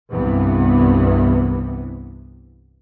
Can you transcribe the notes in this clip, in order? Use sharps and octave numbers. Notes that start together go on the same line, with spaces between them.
C2 G2 C3 E3 B3